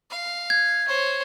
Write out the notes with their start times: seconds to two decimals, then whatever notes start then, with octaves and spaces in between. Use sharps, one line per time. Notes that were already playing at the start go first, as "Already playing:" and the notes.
0.10 F5
0.50 G#6
0.88 C5 C#5